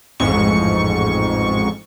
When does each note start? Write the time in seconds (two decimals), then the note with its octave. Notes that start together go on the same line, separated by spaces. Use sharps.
0.20 A1 F2 G#2 C#6